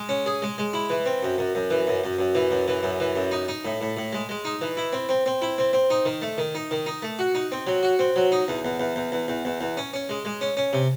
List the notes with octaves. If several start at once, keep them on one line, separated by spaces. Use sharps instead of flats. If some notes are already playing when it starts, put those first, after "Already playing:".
Already playing: G#3
C#4
G#4
G#3
G#3
E4
E3
C4
F#2
F#2
F#2
E3
F#2
F#2
F#2
E3
F#2
E3
F#2
E3
F#2
D#4
D#4
A2
A2
A2
G#3
G#3
D#4
E3
E4
C4
C4
C4
E4
C4
C4
D#4
D#3
A3
D#3
D#4
D#3
D#4
A3
F#4
D#4
C4
F#3
F#4
C4
F#3
D#4
E2
E2
E2
E2
E2
E2
E2
E2
C#4
C#4
G#3
G#3
C#4
C#4
C3